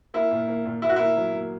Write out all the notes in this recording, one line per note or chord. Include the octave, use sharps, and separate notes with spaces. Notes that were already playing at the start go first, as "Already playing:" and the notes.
A#3 E4
A#2
A#3
A#2
A#2 E4
F#4
A#3 E4
F#3
A#3